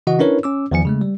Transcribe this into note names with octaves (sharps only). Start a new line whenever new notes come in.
C#3 E3 F#4 D#5 F#5
C#4 D4 E4 A#4 B4 C#5
C#4 D6 E6
E2 D#3 F3 G#5 C#7
C#3 G#3 A3
G3